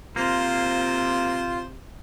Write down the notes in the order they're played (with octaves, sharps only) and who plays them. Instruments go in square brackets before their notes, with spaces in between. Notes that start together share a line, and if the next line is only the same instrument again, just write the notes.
[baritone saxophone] C3 [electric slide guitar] A#3 [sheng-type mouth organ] F4 [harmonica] C5